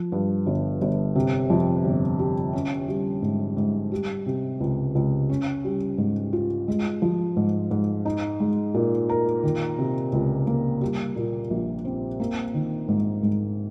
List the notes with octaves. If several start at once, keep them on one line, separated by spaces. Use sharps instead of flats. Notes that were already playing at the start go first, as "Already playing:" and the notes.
Already playing: F3
G2
G1
G1
C3
F2
G1
G3
C#4
G3
G#2
G#2
G3
C3
C#2
C#2
C#4
G3
G#2
F4
G#3
F3
G#2
G#2
D#4
G#3
A#2
A#4
D#3
C3
C#2
A#3
G3
A#2
A#1
C4
A#3
D#3
G#2
G#2